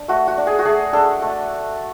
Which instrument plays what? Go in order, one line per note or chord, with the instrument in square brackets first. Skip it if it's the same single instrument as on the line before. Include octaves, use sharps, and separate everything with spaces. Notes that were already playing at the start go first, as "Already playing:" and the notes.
Already playing: [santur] D4
A3 F#4
F#4
D4
G#4
F#4
A3 G#4
D4 A4
A3